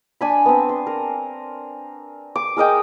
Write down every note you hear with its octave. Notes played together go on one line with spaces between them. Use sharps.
D4 G#5 B5
B3 C4
C6
A#4
D6
G#4 A#4 D#5 G5